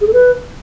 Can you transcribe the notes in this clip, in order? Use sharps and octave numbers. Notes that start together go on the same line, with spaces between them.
G#4
A4
B4